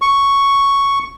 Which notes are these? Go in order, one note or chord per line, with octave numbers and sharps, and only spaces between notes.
C#6